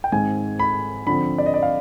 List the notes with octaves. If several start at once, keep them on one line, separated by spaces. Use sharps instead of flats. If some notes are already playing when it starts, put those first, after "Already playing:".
G5
G#2 D#3 G#3 C4 G#5
B5
D3 F3 C4 B5
D5
D#5
D5
F5